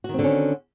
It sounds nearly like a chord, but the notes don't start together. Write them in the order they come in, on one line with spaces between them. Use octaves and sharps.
F#4 D#3 C4 D3 C#4